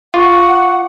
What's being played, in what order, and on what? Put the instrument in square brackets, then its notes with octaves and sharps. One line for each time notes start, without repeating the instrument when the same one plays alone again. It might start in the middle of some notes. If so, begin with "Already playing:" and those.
[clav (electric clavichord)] F4 [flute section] F#5 [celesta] C#6 D6